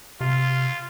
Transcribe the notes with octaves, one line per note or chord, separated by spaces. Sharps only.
C3 F4